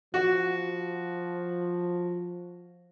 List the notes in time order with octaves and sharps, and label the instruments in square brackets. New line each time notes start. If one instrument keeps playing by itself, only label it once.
[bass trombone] F3 [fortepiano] F#4